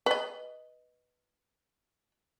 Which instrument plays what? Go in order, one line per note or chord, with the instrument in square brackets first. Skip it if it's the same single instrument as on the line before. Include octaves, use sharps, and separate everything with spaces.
[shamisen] B4 D#5